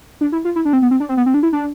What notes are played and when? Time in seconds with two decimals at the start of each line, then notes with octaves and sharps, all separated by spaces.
0.21 D4
0.32 E4
0.45 F4
0.56 E4
0.65 D4
0.73 C4
0.82 B3
0.91 C4
1.00 D4
1.09 C4
1.17 B3
1.26 C4
1.34 D4
1.43 E4
1.53 D4